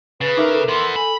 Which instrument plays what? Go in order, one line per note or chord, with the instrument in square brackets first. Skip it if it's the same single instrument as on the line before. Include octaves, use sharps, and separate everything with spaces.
[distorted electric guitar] C#3 [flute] B4 [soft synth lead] A6
[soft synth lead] D#4 [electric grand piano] A#4 E5 D6
[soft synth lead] A4
[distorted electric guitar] E3 B3 [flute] C6
[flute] G#5 [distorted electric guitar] B5